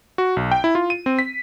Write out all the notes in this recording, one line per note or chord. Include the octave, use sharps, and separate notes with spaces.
F#4
B1
G5
E4
F4
D#7
C4
B6